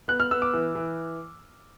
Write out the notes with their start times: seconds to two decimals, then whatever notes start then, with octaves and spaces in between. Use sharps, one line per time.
0.08 B3 F#6
0.20 F6
0.31 B3 E6
0.42 D6
0.53 E3
0.75 E3